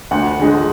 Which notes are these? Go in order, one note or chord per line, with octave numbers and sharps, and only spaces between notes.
D2 F#5
D3 G#3